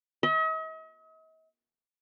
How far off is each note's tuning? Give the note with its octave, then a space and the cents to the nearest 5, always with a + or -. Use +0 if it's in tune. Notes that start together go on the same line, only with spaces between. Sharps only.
D#5 +45